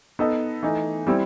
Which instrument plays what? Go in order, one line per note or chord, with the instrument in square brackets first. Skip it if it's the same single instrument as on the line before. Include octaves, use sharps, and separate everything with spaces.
[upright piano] B3 D#4 A4 D#5
E3 A3 D#4
G3 C4 E4